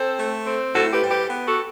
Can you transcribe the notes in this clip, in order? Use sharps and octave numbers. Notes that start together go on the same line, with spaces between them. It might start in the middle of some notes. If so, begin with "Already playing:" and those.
Already playing: C4 A4 C5
A3
C4
A2 F#4 A4
G4 B4
G3
G4 B4
B3
F#4 A4